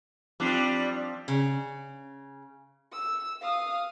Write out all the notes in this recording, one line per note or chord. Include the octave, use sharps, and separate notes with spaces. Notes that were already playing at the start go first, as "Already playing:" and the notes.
F3 G3 C4 D4 C7
C#3
E6
F5 D#6